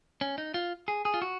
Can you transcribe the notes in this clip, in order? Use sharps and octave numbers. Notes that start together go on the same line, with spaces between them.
C#4
D#4
F4
G#4
G#4
F4
F#4